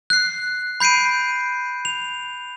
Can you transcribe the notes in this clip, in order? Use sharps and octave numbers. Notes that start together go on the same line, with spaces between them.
F#6 C7
B5 G6 C7 D7 D#7
F7